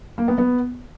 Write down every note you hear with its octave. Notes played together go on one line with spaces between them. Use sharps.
A#3
B3
B3